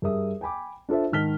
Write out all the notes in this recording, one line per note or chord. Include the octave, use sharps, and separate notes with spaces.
G2 G#4 A#4 E5 D#6
G5 G#5 B5 D6
D4 F4 A4 C5 E5
G#2 D#3 A5 F6 B6 G7